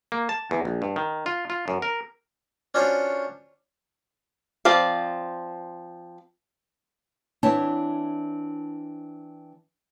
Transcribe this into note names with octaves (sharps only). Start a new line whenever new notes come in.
A#3
A5
E2
A#1
G2
D#3
F4
F4
F#2
A#4
C#4 D4 F4 F#4 C5 C#5
F3 C4 D5 F5
E3 C4 D4 E4 C#5 A5